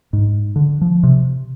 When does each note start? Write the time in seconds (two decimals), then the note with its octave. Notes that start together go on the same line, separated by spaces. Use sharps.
0.13 G#2
0.56 D3
0.81 F3
1.03 C3